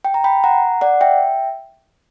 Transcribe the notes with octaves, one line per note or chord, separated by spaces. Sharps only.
G5
A#5
G5 B5
F#5 A#5
D5 F#5
E5 G5